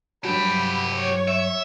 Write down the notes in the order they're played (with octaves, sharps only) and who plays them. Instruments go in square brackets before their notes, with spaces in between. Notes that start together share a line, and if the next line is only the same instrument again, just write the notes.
[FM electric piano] G2 F#3 [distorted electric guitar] F3 G4 [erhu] B5
[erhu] C#5
[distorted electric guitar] E5